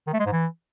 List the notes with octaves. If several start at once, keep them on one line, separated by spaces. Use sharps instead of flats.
D#3
A3
G#3
G#2
E3